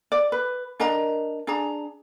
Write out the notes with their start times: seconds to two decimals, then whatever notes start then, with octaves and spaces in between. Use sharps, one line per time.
0.12 D5
0.32 B4
0.80 D4 A#4 D#5 A#5
1.47 D4 G#4 A#5